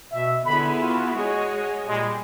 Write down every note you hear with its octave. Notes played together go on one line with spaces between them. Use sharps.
B2 E5
D3 B3 E4 G#4 B5
F4 F#4
G#3 G#4 C#5 D#5
A#2 G3 G#3